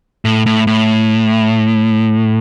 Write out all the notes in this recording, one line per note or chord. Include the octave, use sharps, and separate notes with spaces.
A2
A2
A2